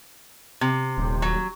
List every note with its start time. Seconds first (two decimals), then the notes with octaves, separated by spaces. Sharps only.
0.61 C3
0.97 D#1
1.22 F#3